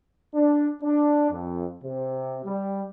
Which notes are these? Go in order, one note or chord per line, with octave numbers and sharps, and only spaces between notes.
D4
D4
F2
C3
G3